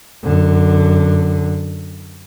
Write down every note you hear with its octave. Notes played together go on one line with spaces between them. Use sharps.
F#2 D3